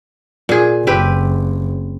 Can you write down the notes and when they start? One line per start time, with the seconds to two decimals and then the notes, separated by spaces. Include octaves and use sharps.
0.49 A#2 G#4
0.87 F#1 C4 G4 B4